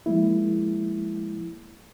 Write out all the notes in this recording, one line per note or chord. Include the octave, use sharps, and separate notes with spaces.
F3 G#3 A#3 E4